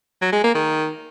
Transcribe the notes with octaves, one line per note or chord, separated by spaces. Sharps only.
F#3
G#3
A#3
D#3